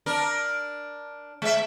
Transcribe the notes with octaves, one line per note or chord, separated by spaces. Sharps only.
D4 A#4
G#3 E5